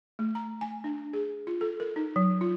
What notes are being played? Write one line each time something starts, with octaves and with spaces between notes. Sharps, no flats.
A3
A#5
G#5
D4
G#4
F4
A4
A#4
D#4
F#3
F4